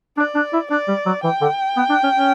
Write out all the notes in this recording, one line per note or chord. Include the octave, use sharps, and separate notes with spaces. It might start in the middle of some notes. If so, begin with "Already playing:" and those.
D4 D5
D4
E4
D4 D5
G3
F#3
E3 G5
D3
B3
D4
C#4
C#4